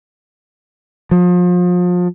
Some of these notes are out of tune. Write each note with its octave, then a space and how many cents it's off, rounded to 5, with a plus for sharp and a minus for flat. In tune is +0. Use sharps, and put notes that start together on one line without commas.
F3 +35